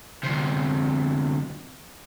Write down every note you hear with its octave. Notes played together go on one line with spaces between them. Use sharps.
D2 C3